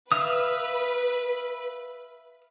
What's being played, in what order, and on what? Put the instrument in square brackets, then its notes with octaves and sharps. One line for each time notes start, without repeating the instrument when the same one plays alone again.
[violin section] B4 [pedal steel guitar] E5 F5 D#6